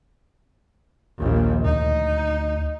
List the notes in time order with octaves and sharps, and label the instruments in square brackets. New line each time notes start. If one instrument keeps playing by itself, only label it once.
[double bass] A#1 D#2
[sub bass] D2 [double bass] D#4